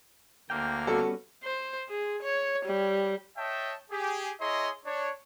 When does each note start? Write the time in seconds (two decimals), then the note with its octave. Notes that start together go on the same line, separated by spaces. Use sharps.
0.50 D2 A#3 G5 F6
0.87 G3 B3 C#4 F#4 A4
1.43 C5
1.89 G#4
2.23 C#5
2.65 G3
3.37 C#5 D#5 E5 G5 A5
3.91 G4 G#4
4.39 E4 G#4 C#5 D#5 A#5 C6
4.85 D4 C#5